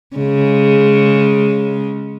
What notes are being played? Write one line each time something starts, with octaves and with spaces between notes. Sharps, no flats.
C#3 G#3